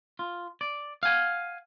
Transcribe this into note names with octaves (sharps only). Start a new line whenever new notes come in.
F4
D5
F5 F#5 G#5